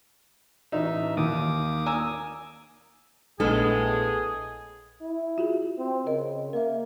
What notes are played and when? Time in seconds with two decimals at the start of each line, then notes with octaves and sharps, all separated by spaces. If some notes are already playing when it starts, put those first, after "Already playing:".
0.72 A1 D#4 E5
1.17 D#2 A#3 D6 D#6
1.86 G#5 A#5 E6
3.40 A#1 A2 G#3 A3 B3 D4 G#4 A4
5.01 E4
5.38 F4 F#4 G#4
5.78 C4
6.07 C#3 A#4 D#5
6.53 A#3 A#4 E5